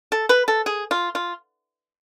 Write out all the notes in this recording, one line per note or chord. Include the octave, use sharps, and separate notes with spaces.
A4
B4
A4
G#4
F4
F4